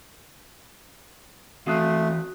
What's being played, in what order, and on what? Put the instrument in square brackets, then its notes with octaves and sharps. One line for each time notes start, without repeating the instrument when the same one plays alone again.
[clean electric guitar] E3 C4 F5 [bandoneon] A3 [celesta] F#4 D#6 F#6